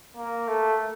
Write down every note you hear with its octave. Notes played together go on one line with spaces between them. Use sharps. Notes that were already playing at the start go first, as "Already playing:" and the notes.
A#3
A3